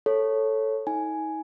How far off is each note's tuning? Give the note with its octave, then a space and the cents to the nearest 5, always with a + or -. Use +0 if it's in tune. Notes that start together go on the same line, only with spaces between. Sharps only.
A4 +0 C#5 -10
D#4 +40 G#5 +5